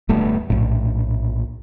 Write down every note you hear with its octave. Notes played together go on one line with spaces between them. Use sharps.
D1 G2 A3 B3
A#1 A2